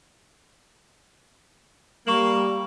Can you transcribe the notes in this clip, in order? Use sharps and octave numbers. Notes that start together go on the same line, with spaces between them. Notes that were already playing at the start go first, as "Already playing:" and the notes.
G3 A#3 C#6 E7 F#7